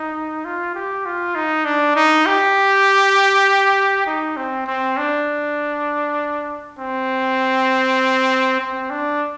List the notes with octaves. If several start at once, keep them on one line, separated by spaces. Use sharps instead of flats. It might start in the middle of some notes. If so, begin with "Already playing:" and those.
Already playing: D#4
F4
G4
F4
D#4
D4
D#4
G4
D#4
C4
C4
D4
C4
C4
D4